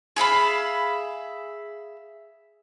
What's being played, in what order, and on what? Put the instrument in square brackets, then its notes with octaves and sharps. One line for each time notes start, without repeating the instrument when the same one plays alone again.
[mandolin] G#4 E5 F5 B5